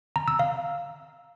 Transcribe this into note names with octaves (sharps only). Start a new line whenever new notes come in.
A#5
E6
F5